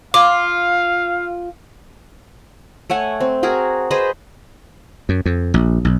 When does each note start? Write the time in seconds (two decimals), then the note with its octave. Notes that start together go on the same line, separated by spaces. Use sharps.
0.14 F4 F5 D6
2.90 A3 C#5 F#5 G#5
3.20 C4
3.43 F#4 G#4 A#4
3.91 G#4 B4 C5 D#5
5.09 F#2
5.26 F2
5.54 A#1
5.85 B1